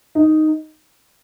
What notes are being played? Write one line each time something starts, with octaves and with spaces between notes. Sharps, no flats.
D#4